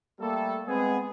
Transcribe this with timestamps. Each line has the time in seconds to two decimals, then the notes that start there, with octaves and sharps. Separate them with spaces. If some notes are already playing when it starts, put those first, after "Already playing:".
0.20 G3 A3 A#3 A4
0.67 G#3 B3 C4 G#4